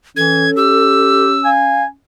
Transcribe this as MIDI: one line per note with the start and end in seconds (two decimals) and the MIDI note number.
0.17 0.49 52
0.17 1.94 61
0.17 1.25 69
0.17 0.50 92
0.57 1.37 67
0.57 1.49 88
1.45 1.82 77
1.45 1.85 80